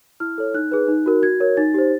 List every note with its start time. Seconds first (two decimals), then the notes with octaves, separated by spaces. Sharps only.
0.20 E4 F6
0.38 A4 C#5
0.54 D#4 F#6
0.71 G#4 B4
0.88 D#4
1.06 F#4 A#4
1.22 F#4 G#6
1.40 A#4 C#5
1.57 D#4 A6
1.74 G4 C5